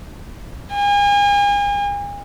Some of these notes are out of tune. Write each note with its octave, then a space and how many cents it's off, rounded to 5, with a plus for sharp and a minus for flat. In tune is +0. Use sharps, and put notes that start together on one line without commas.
G#5 -40